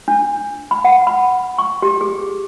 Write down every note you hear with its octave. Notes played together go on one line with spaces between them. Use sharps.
D4
B5
F#5
B5
C#6
G4
G#4